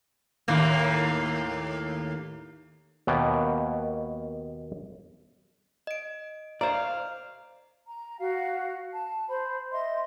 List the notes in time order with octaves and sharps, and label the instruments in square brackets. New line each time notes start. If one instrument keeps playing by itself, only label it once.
[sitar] D#2 A2 A#3
[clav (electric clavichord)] D#2 B2 A#3 B3 G5
[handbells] D#5 D7
[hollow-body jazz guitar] C5 D5 [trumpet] F5 [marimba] A#5
[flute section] A#5
F#4 F5
A5
C5 B5
D#5 E5 C6